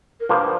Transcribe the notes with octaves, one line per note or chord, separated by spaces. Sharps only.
A#4
G2 F3 A#3 C5